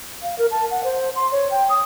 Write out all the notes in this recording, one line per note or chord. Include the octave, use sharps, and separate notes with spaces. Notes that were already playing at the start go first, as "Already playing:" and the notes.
F5
A#4
A5
F#5
C5
C6
C#5
G5
D#6